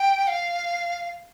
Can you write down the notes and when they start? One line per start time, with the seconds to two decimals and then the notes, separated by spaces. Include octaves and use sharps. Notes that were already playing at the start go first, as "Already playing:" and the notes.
Already playing: G5
0.27 F5